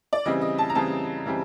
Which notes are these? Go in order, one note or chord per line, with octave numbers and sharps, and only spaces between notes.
D5
C#3 E3 G3 C4 D#5
D#5
A5
A#5
C#3 E3 G3 C4 A5
C#3 E3 G3 C4